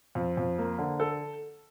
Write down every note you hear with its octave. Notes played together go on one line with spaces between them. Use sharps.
F2
F2
A#3
D3
A4